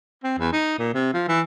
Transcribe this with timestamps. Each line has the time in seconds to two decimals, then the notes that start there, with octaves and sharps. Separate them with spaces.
0.24 C4
0.38 E2
0.52 D#4
0.79 A#2
0.94 C3
1.14 F3
1.28 E3